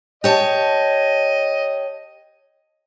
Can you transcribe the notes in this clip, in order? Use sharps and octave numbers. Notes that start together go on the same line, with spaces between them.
G4 C#5 D#5 A5